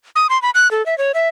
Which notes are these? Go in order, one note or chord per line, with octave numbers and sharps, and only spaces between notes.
D#6
C6
B5
F#6
A4
E5
C#5
E5